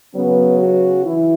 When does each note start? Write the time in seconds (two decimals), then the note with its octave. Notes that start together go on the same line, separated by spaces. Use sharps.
0.14 C#3 F#3 B3 C#4 B4
0.59 F#4
1.04 E3 E4